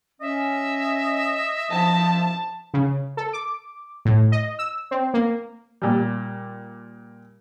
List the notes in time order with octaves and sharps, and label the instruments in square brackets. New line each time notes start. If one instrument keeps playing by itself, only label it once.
[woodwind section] C#4 [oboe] D#5 [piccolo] E5
[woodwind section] F3 [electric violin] A5
[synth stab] C#3
A4
D6
A2
D#5
E6
C4
A#3
[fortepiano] A#2 G3